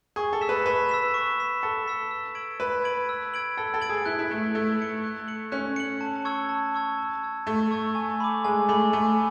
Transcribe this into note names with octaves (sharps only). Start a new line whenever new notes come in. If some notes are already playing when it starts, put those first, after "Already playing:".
G#4 C#6
A4
E6 B6 E7
B4
B4 C#6
E6 B6 E7
C#6
E6 B6 E7
A4 C#6
E6 B6 E7
E6
G#6 D7 F#7
B4 E6
G#6 D7 F#7
E6
G#6 D7 F#7
A4 E6
A4
G#6 D7 F#7
G#4
E4 F#6
E4
A3 C#7 F#7
A3 F#6
C#7 F#7
F#6
C#7 F#7
C#4 F#6
C#7 F#7
A5
C#6 E6 G#6
A5
C#6 E6 G#6
A5
C#6 E6 G#6
A3 A5
C#6 E6 G#6
G#5
B5 D6
G#3 G#5
A3 B5 D6
A3 G#5